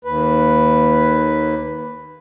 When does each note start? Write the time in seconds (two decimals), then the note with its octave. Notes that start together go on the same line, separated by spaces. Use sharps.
0.05 D#2 B4